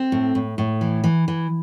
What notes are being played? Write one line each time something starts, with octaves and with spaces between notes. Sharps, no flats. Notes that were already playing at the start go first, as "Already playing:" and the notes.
Already playing: C4
A2
A2
A2
E3
E3
E3